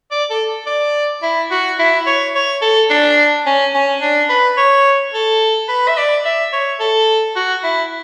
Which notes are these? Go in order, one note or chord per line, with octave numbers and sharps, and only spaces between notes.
D5
A4
D5
E4
F#4
E4
C#5
C#5
A4
D4
C#4
C#4
D4
B4
C#5
A4
B4
E5
D5
E5
C#5
A4
F#4
E4